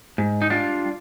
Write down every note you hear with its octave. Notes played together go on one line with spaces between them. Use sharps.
G#2
D#4
G3 D4 F4